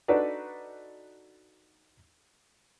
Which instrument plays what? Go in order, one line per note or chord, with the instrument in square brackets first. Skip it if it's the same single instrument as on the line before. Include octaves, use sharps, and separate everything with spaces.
[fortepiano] D4 D#4 F#4 A4 B4 D5